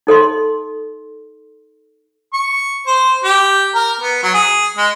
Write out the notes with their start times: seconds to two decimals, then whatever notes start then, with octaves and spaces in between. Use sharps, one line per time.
0.07 D#4 A4 D#5 C6
2.34 C#6
2.87 C5
3.24 G4
3.75 A#4
4.01 B3
4.23 F#3
4.34 G#4
4.77 G#3